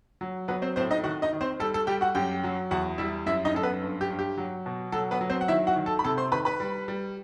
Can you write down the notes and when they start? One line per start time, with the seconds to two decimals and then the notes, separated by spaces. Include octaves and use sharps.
0.21 F#3
0.48 F#3 B3 B4
0.62 C4 C5
0.76 A2 C4 C5
0.91 D#4 D#5
1.04 D#3 F#4 F#5
1.22 D#4 D#5
1.33 D#3
1.41 C4 C5
1.60 G3 A4
1.74 A4
1.87 G3 G4 G5
2.01 F#4 F#5
2.15 F#2 G4 G5
2.44 F#3
2.71 E2 F#4 F#5
2.98 G3 E4 E5
3.26 F#2 E4 E5
3.45 D#4 D#5
3.54 F#2 A4
3.63 B3 B4
3.81 G2
4.01 G4
4.10 G2
4.19 G4
4.38 F#3
4.66 B2
4.92 F#3 A4
5.11 B3 B4
5.21 F#3
5.30 C4 C5
5.41 F#5
5.48 D#3 E4 E5
5.67 F#4 F#5
5.76 D#3
5.86 A4 A5
5.99 B5
6.04 C3 A4 A5
6.17 C5 C6
6.32 D#3 B4 B5
6.45 B4 B5
6.60 G3
6.88 G3